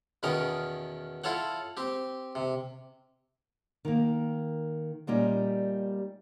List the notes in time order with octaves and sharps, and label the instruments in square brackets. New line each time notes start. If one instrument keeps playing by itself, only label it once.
[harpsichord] E2 B2 D#3 C#4 A#4 D#6
E4 F4 A4 C#5 F#5
C4 G4
C3
[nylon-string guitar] D#3 A#3
A#2 G3 C#4 D#4